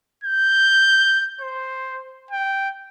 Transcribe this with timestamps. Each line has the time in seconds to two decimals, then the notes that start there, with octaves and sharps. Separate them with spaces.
0.24 G6
1.41 C5
2.31 G5